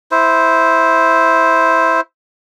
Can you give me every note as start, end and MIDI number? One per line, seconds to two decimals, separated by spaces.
0.11 2.01 64
0.11 2.01 72